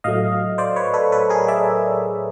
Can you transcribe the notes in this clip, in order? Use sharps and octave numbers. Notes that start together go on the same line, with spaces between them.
A2 F#3 A3 D#5 F5
C5 D5
B4 C#5
A4 B4
A4 B4
G#4 A#4
D5 E5